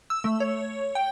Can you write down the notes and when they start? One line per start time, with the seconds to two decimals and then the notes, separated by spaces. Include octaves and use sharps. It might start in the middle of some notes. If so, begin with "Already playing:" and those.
0.10 E6
0.24 A3
0.40 C#5
0.95 G5